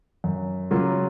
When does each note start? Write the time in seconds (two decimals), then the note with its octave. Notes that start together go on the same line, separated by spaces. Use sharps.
0.24 F#2
0.71 C#3 F#3 A#3 F4